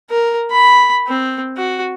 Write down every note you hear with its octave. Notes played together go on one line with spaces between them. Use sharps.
A#4
B5
C4
F#4